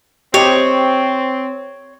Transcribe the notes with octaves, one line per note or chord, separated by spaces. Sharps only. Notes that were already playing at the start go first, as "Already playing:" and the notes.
C4 G4 C#5 D#5